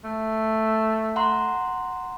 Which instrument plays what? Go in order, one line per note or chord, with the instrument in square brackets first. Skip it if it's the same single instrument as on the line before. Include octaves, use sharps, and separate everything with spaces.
[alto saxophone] A3
[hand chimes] F#5 A#5 C6